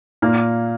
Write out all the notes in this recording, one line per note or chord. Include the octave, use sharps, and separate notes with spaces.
A#2 A#3